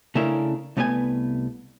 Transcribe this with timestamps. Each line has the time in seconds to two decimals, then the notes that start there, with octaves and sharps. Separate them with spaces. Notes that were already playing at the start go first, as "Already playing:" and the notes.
0.15 C#3 A3 C#4 D4 E4 A#4
0.77 C2 A3 B3 B4 C#5 G#5